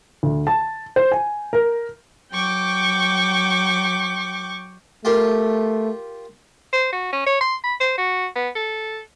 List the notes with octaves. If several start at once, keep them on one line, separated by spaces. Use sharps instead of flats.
D2
A5
C5
G#5
A#4
F#3 G5 C#6 D6
A3 F4 G4 A#4
C5
F#4
C#4
C#5
C6
B5
C5
F#4
B3
A4